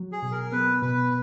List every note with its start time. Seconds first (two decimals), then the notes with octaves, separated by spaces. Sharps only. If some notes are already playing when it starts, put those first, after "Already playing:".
Already playing: F#3
0.12 G#4
0.22 B2
0.32 A#4
0.52 B3 B4
0.82 B2 B4